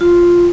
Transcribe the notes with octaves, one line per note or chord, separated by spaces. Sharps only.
F4